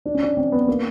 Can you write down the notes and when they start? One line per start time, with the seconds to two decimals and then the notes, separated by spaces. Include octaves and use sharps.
0.05 D4
0.14 C#4
0.23 D4
0.37 C4
0.52 B3
0.68 A#3